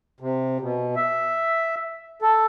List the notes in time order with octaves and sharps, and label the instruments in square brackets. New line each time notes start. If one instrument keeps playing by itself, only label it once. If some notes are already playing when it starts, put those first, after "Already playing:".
[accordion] C3
B2
E5
A4